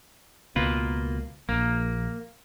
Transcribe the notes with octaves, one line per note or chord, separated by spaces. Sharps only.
C#2 B2 A#3 F4 B4
A#1 A#3